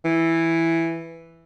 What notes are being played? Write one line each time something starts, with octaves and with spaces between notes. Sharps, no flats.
E3